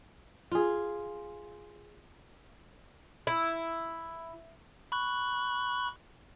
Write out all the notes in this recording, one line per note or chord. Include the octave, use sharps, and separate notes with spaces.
F4 G#4
E4
B5 C#6 F#6